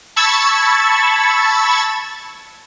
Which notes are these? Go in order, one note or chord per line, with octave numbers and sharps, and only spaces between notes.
A5 B5 C#6 E6 G#6 A6